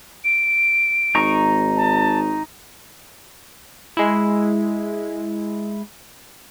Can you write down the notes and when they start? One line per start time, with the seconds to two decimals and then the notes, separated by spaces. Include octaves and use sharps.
0.25 D7
1.15 G#1 D#4 A#5 C#6
1.77 A5
3.97 G#3 E4